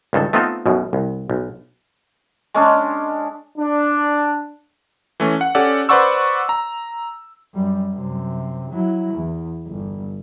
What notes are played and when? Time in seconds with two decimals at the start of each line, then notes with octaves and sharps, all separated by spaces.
0.13 C#2 G2 D#3 A4
0.33 A3 B3 C4 D#4 F4 A4
0.66 B1 F#2 B2
0.93 C2
1.30 B1
2.54 G#3 C#4 D4
3.58 D4
5.20 E3 A3 C#4
5.41 F#5
5.55 C#4 G4 A4 D5 F#5
5.89 B4 C5 D5 F#5 C#6 E6
6.49 A#5
7.54 F#2 G3
7.92 F#2 C3
8.71 F#3 E4
9.14 E2
9.67 G1